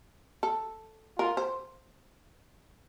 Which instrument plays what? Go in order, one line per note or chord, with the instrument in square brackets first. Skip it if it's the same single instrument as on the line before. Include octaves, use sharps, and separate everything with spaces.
[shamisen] A4
[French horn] F4 [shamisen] A#4
[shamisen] C5